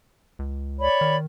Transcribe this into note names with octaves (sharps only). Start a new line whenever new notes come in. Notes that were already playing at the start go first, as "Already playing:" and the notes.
C#2
C#5 D5 B5
D#3